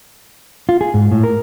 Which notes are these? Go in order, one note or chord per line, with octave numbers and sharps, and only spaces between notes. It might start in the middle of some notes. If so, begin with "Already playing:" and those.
F4
G#4
G#2
A2
A#4